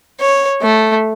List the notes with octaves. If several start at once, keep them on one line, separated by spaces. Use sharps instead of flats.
C#5
A3